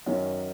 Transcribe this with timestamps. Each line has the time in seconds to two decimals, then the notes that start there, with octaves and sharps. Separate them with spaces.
0.06 F#2 D#3 F#3 C#4